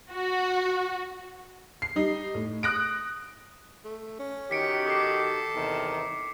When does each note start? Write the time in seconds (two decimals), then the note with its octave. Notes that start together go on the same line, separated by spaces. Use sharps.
0.12 F#4
1.82 C7
1.96 G3 D#4
2.34 A2
2.63 D#6 F#6 A#6 D7
3.85 A3
4.19 C#4
4.51 D#3 F#4 G4 B6 C#7 D7
4.87 A4 D6 C7
5.55 E2 C3 D#3